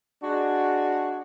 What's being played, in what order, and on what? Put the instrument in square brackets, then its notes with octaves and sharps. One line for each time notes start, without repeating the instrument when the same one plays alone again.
[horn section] G#3 D4 F#4